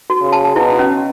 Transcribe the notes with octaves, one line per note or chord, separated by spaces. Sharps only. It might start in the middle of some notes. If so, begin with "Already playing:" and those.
F#4
C#3
A5
B2 E4
C#4